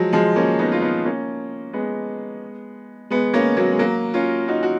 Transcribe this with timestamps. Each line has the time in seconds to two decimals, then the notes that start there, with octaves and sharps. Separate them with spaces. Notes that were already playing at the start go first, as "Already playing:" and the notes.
Already playing: F3 F#3 G#3
0.13 F3 G#3
0.36 A#3 C#4
0.59 B3 D#4
0.72 F4
0.81 B3 D#4
1.05 A#3 C#4
1.73 G#3 B3
3.10 G#3 B3
3.34 A#3 C#4
3.57 F#3 A#3
3.72 G#3
3.79 F#3 A#3
4.14 C#4 F4
4.48 D#4 F#4
4.63 F#4